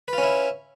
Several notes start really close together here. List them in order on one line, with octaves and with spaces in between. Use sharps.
B4 F4 C#4 E4